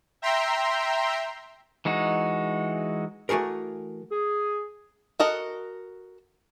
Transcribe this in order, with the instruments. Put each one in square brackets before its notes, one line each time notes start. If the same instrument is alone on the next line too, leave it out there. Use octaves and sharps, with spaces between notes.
[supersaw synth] E5 G5 A#5 C6
[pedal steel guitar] E3 G#3 D#4 F#4
[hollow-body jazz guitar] E3 A3 F#4 G#4 A#4
[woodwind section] G#4
[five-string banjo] F#4 A4 A#4 D#5 F#5